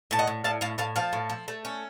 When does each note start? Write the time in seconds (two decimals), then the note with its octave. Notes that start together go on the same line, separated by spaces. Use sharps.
0.11 A2 A5
0.19 D#5 F#5
0.27 A2
0.44 A2 F5 A5
0.61 A2 F5 A5
0.78 A2 F5 A5
0.96 F3 F5 A5
1.13 A2
1.30 F3
1.48 A3
1.65 C#4